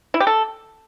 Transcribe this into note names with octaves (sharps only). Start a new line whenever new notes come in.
E4
G4
A4